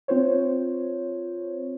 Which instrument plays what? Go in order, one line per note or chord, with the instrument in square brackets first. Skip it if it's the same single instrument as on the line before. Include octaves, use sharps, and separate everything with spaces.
[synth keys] C4 F4 C5 C#5